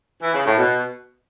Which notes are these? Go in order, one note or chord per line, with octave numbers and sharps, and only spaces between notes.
E3
C#3
A2
B2